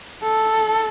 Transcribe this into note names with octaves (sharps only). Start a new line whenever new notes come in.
A4